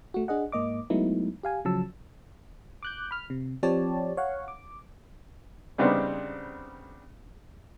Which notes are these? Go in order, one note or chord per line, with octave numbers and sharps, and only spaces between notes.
A3 F#4
D4 G#4 D#5 F#5
G#2 A#3 D#5 D6
F#3 G#3 A3 B3 D#4 E4
G4 F5 G#5
C#3 F3 F#3 A5 E6
D6 F#6 G6
B5 F6
C3
F3 C4 G4 C#5 D5 A5
C#5 F5 F#5
D6
C#3 G3 B3 C4 D4 D#4